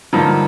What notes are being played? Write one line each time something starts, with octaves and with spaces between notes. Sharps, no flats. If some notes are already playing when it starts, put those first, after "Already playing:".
G2 D3 F3 A#3 D#4